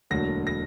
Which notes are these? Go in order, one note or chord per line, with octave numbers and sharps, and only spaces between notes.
E1 D2 D3 F#3 A#3 A#6
A#6